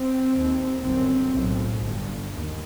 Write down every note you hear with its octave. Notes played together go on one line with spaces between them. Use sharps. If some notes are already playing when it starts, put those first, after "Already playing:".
Already playing: C4
D#2
G1 F#2 C4
B1 A2
G1 G2
D#2